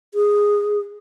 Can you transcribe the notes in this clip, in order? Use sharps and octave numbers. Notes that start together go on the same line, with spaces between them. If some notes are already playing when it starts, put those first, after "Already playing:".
G#4